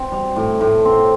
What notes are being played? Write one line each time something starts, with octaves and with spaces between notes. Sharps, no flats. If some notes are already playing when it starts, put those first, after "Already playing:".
Already playing: C4
G3
A2
A2
C4